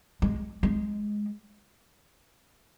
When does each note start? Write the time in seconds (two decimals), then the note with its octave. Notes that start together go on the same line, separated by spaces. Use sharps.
0.22 G#3
0.63 G#3